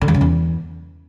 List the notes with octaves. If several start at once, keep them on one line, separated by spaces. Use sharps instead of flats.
D3
E2
C#3
E2